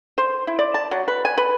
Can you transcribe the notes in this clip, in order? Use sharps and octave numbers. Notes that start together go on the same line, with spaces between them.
C5
E4
D5
A5
F#3
B4
G#5
B4